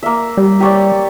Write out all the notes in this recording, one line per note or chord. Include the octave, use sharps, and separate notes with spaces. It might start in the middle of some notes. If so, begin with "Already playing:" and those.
A#3 E5
G3
G4 C#5 D5